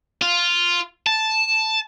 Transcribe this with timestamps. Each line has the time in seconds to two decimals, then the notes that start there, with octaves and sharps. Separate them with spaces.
0.22 F4
1.07 A5